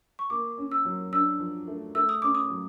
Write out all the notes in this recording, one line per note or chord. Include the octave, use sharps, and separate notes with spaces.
C#6
A#3 D6
C#4
E6
F#3
D4 E6
F3
A3
A3 E6
D#6
C#4 D6
D#6
F#3